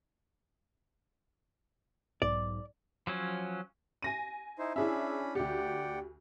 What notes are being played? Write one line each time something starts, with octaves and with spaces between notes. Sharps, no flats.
B1 G#2 D5
F3 F#3 C#4
G#5 A#6 D#7
D#4 E4 C5
C#4 D4 E4 G#4 E5 B5
D2 G4 D5 F#5 G5